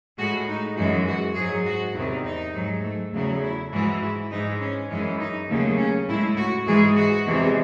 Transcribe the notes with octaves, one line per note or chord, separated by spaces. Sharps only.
A2 G#3 F#4
D#4
F#2 E3 G#3 F#4
F#4
G#2 F#3 G#4
F#4
E2 C3 D#3 F#3 E4
D#4
G#2 F#3
A3
E2 C#3 F#3 A3
E4
G#2 E3 G#3 F#4
E4
G#2 E3 G#3 D#4
C#4
F#2 E3 G#3 C#4
D#4
D#2 C#3 F#3 A3
C#4
A2 G#3 E4
F#4
G#2 E3 G#3 G#4
F#4
E2 C3 E3 G#3